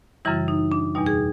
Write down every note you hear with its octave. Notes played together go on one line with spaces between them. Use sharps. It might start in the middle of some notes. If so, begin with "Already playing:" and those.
F#2 C#3 E3 G3 E4
D#4
D4
E2 B2 G3 D#4
G#4